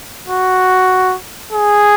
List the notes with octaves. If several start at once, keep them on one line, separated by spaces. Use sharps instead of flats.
F#4
G#4